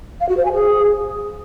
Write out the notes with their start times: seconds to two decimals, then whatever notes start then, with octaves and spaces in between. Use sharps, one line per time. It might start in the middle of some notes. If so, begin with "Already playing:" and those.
0.21 F5
0.29 F#4
0.37 C5
0.45 G#5
0.54 G#4